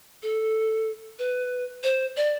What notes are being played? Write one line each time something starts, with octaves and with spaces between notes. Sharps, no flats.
A4
B4
C5
D5